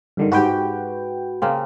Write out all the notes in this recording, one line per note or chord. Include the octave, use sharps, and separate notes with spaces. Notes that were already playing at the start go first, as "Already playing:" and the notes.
G2 D3 D#3
G#2 F#4 G4 B4 G5
C#3 A#3 C4